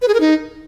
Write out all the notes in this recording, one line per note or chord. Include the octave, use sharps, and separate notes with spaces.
B4
G#4
A#4
D#4